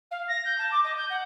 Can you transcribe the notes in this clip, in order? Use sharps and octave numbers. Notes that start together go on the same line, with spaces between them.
F5
A#6
G6
A5
D6
D#5
G6
F#5